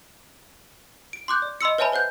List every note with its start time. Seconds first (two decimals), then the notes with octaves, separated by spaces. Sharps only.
1.13 D7
1.28 C6 D6 F#6 G6
1.42 D5
1.61 D#5 B5 C6 E6 C#7
1.78 B4 C#5 E5 G#5 A5 B5
1.92 B4 C5 F#5 G6